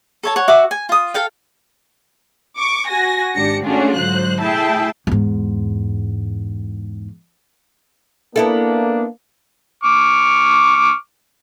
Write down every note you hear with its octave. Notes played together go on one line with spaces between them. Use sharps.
A4 C#5 A5
C#5 F#5
F#4 E5 F#5 D6
G#5
F4 D#6
A4 F5 G5
C#6 D6
F#4 G#5 A#6
G#1 G#2 D4 G4 A#6 C#7
A3 C#4 D4 F4 F#4 G#4
G#2 D3 F#3 C5 F#6
A3 E4 G#4 E5 G5 A5
E2 G#2
A#3 B3 D4 E4 A4
C#6 D6 F6